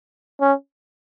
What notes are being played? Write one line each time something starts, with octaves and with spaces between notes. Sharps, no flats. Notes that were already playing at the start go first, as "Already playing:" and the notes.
C#4